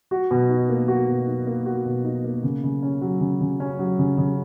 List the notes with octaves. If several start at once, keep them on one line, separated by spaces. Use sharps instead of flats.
F#4
B2
D#4
A#3
F#4
B2
D#4
A#3
F#4
B2
D#4
A#3
C#3
C#3
C#4
F#3
C#3
C#3
C#4
F#3
C#3
C#3